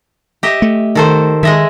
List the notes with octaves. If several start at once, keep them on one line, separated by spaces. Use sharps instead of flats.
G4 D#5 E5
A3
D#3 A4 C5
D#3 G#3 D#5 E5